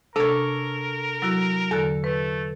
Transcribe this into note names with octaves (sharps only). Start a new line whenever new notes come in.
C3 D4 A4 A#4 C#5
F#3 E4 F#4
E2 D3 A4
A3 B4